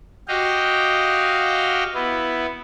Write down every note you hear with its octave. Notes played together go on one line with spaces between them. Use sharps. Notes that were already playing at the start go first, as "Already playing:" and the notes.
F#4 G4 D#5 F5 G5
B3 E4